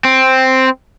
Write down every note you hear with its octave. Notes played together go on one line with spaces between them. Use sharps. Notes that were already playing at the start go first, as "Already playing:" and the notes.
C4